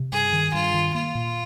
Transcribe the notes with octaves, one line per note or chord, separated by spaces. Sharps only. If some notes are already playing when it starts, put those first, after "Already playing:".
Already playing: C3
G2 G#4
D#3
G2 F4
D#3
A#3 F4
A#2